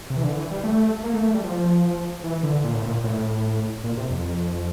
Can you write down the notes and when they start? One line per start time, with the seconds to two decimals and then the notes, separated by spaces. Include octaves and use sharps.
0.10 C3
0.17 E3
0.24 D3
0.37 E3
0.50 G3
0.64 A3
1.03 A#3
1.13 A3
1.24 A3
1.34 G3
1.44 F3
2.24 E3
2.43 D3
2.64 A#2
2.74 A2
2.84 A#2
3.04 A2
3.84 A#2
3.97 C3
4.10 F2